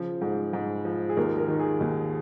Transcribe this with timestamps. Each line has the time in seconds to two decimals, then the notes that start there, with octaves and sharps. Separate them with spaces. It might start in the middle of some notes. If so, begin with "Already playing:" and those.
Already playing: C#3 F3
0.21 G#2
0.53 G#2
0.85 F3
1.09 G#4
1.17 D#2 A#4
1.38 A#4
1.48 D#3
1.59 G#4
1.81 D#2